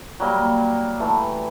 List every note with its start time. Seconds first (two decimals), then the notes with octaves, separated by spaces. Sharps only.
0.20 F#3 G3 A#3
1.00 E3 A3